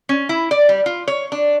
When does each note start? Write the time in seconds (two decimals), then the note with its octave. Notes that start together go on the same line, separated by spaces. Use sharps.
0.09 C#4
0.29 E4
0.51 D5
0.69 G3
0.86 F4
1.08 C#5
1.32 D4